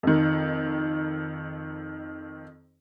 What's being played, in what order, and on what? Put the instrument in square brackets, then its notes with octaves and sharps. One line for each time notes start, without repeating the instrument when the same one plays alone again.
[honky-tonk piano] F2 D#3